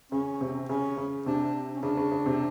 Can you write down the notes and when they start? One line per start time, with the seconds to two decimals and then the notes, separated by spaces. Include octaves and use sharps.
0.12 C#3 C#4
0.41 C3
0.69 C#3 C#4
0.97 C#3
1.26 C3 D4
1.77 C#4
1.83 C#3 D4
1.97 C#3
2.12 C#3
2.26 C3